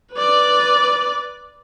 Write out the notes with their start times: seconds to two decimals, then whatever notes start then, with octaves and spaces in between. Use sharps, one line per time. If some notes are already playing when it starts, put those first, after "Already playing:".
0.14 B4 D5